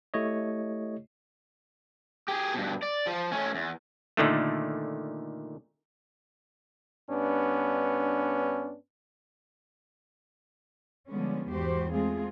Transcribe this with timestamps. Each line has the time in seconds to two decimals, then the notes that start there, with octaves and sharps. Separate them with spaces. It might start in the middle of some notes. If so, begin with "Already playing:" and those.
0.14 A3 E4 G4 C#5 D#5
2.28 G4 G#4
2.54 G2 B2
2.83 D5
3.07 F3
3.32 A3 C#4
3.55 E2
4.17 A#2 D3 D#3 A3
7.10 G2 B3 C#4 D4
11.09 D3 F3 G3 G#3 B3 C#4
11.49 E2 G#2 F#4 G4 C5
11.91 G#3 A3 C4 F4 G#4